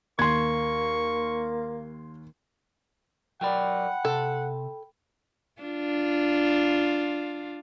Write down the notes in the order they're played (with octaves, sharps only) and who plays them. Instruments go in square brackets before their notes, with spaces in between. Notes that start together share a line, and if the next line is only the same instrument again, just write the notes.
[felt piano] D#2 [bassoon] A#3 [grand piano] C6 G#6 [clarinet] C#6
[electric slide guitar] F#3 A#4 D5 [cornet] F#5 [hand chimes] G5 B5
[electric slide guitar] C3 [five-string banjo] A4
[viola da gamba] D4 F4